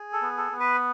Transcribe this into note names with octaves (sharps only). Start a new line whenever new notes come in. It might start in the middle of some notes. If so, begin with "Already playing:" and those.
Already playing: G#4
A4
B3
A4
B3
B4